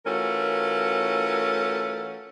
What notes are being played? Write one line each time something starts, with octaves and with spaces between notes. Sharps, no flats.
E3 A3 C#4 F4 F#4 A#4